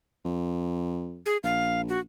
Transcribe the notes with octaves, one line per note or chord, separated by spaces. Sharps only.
F2
G#4
A#1 F5
F#4